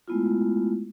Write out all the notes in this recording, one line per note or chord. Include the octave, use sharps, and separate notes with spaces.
G#3 A3 B3 E4 F4